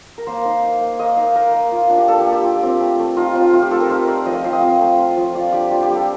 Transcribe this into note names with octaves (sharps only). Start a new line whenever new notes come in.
A#4
A#3 C5
D#4
D#4
A#3
A#3 D#5
D#4 F5
D#4 A#4
A#3
F4
D4
G4
A#3 A4
G4
A#3
G4
F4
C4
A3
A3
D#4 F4
C4 F4
A3 F4
G4
A3 A4
A#4
D#4 C5
A3 D5
F3 D#5
G5
F3 F5
D#5
C4
A3
F4
F3
F4 D5
D4 G4
G3 F4
G4
G3
A4